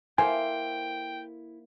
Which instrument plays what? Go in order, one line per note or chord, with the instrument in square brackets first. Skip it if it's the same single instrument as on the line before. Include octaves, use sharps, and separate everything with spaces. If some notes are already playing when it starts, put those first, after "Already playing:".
[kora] A#3 A4 C5 [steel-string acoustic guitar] E4 [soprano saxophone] G5 [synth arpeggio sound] G#5